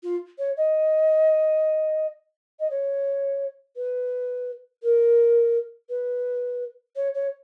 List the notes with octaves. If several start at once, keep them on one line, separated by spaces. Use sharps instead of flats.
F4
C#5
D#5
D#5
C#5
B4
A#4
B4
C#5
C#5